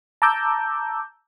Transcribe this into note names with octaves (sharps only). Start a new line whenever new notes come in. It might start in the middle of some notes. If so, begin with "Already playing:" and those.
A5 A#5 D6 E6 G6